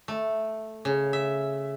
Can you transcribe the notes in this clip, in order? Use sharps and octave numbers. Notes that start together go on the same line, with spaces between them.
A3
C#3
E5